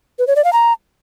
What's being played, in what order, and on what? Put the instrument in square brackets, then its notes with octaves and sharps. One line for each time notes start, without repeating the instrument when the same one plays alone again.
[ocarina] B4
C#5
D5
F5
A#5